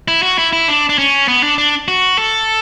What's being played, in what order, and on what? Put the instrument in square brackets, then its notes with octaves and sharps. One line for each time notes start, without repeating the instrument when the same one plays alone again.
[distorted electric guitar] E4
F#4
E4
E4
D4
D4
C#4
B3
D4
D4
F#4
A4